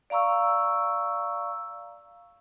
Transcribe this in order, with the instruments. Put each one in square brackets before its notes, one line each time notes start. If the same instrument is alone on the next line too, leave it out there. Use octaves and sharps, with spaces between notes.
[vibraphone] D5 F5 A#5 C#6 E6